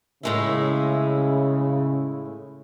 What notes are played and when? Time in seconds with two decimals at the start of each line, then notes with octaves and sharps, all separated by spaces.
0.23 A2 C#3 G#3 E4